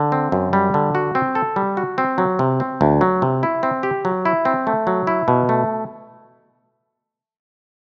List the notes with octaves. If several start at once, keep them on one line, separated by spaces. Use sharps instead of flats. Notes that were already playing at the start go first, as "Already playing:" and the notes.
Already playing: D3
C4
F#2
G3
D3
F#4
C4
A4
G3
F#4
C4
F#3
C3
C4
D2
F#3
C3
E4
C4
G4
F#3
E4
C4
A3
F#3
E4
B2
A3